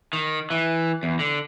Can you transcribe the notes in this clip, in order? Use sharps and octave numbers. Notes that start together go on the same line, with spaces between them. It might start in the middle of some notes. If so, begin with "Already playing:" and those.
D#3
E3
E2
D3